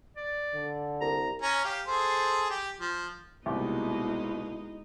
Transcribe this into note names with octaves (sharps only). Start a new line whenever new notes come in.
D5
D3
C2 A#5
C#4 A#5
G4 F5
G#4 A4 C5
G4
F3
C2 B2 G#3 A#3 D#4 E4 G4